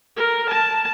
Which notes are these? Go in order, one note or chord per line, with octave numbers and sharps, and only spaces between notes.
A#4
A5